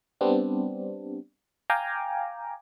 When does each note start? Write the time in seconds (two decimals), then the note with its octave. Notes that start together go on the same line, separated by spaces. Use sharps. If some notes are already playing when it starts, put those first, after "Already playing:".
0.21 G3 B3 C4 D4
1.70 F5 G5 G#5 A#5 D6